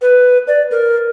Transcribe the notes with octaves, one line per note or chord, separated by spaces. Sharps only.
B4
D5
A#4